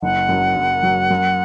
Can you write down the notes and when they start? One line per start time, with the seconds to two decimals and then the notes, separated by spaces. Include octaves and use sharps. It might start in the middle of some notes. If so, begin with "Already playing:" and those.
0.02 F#1 F#5
0.29 F#2 F#3
0.56 F#1
0.83 F#2 F#3
1.11 F#2